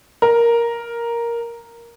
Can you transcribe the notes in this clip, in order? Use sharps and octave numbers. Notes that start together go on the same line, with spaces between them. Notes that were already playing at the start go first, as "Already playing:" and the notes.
A#4